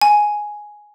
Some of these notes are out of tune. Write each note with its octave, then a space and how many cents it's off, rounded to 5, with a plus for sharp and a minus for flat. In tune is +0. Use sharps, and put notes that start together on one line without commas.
G#5 +5